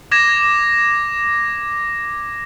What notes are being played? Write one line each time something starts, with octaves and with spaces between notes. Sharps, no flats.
D6 G#6 A#6 E7